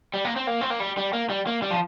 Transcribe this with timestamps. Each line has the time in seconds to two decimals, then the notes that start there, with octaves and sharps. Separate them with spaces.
0.14 G3
0.25 A#3
0.36 C4
0.47 A#3
0.61 C4
0.70 A#3
0.80 G3
0.97 G3
1.13 A#3
1.29 G3
1.47 A#3
1.62 G3
1.71 F3